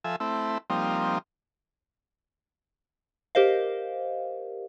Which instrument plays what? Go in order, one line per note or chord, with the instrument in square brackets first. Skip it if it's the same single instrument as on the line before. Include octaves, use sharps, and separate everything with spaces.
[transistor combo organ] F3 A4 E5 G#5
A3 C4 E4
F3 G3 A#3 C4 D#4
[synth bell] G4 A#4 C5 D#5 F5